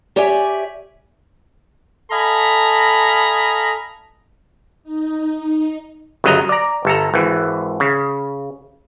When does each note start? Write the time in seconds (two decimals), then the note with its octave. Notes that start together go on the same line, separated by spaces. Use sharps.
0.16 G4 C#5 D5 E5 G#5
2.11 A4 D#5 F5 G#5 A#5 B5
4.84 D#4
6.24 G1 C#3 F#3 D#5 A#5
6.49 D5 A#5
6.85 G1 A4 A#5
7.14 G#1 E3
7.80 C#3